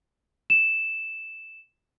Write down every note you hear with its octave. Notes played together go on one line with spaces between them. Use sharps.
E7